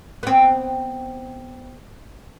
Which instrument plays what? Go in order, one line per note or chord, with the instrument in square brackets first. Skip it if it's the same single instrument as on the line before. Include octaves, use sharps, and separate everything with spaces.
[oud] B3 C4